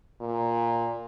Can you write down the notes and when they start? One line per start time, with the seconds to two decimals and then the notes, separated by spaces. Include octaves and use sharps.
0.21 A#2